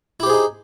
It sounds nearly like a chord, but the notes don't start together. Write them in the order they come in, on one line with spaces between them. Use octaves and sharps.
E4 G4 C5 G#4 D#4